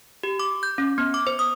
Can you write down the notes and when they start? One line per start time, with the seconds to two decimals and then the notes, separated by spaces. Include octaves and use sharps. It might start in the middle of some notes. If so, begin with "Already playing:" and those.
0.23 G4
0.40 D6
0.63 G6
0.78 C#4
0.98 B3
1.14 D6
1.27 C5
1.39 D#6